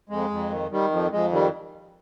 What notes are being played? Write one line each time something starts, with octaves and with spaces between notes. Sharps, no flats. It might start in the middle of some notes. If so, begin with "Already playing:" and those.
F2 G#3
F2
D#3
D#3 G3
F2 F3
F2 G#3
D#3 G3